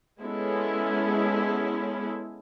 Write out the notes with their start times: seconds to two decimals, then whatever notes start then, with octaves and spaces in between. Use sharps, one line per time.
0.19 G#3 B3 C#4 E4 A4